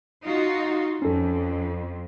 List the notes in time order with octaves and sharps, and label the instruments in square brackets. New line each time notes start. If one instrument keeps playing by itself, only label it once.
[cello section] D#4 F4 F#4
[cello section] F2 [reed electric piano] C#4 A4